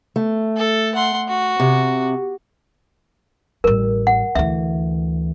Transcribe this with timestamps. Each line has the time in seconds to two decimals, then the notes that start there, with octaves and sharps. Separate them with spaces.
0.16 A3
0.57 A4
0.95 F#5 C6
1.29 F#4
1.60 C3
3.64 A1 G3 A#4
4.07 F#5
4.35 D2 E3 E5